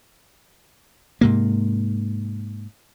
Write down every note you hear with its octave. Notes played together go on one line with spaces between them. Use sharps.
G#2 C3 A#3